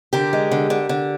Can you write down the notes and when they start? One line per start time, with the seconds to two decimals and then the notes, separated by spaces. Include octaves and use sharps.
0.13 D3 G4 A#4
0.33 G#3
0.52 D3
0.70 D3
0.89 D3